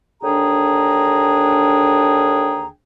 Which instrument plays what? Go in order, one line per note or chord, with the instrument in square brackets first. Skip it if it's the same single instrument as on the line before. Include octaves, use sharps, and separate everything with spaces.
[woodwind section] D#2 D3 D4 G#4 G5 A#5